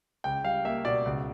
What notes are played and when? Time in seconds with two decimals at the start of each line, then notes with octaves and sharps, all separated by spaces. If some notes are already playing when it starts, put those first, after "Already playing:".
0.24 C#2 G5
0.44 G3 F5
0.65 A#3 E5
0.85 B2 D5
1.05 C#2